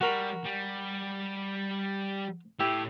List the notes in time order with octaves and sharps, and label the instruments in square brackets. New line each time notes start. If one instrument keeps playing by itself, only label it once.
[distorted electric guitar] G3 [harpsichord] F#4 A#4 B5
[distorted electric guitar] G3
[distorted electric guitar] A2 [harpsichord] E4 G4